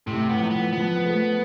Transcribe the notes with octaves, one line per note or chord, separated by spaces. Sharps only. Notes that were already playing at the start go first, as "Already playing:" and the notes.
A2 C3
B3
F3
B3
F3 B3
A3